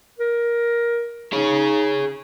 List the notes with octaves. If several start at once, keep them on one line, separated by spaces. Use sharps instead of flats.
A#4
D#4 G#4 C#5